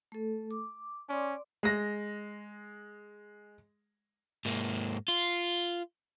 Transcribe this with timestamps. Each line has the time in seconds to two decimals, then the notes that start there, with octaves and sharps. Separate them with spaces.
0.12 A3 A4
0.51 D6
1.09 C#4 D5 C6 D6
1.63 G#3 A#6
4.45 G#2 A#3
5.08 F4